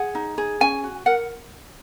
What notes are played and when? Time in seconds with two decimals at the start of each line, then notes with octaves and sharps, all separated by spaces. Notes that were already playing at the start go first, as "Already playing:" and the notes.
Already playing: G#4 F#5
0.15 D#4
0.38 G#4
0.60 C#4 G#5
0.84 F#4
1.06 A#4 F#5